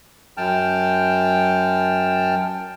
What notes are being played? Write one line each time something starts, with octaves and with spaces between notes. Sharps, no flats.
F#2 G5 A5 F6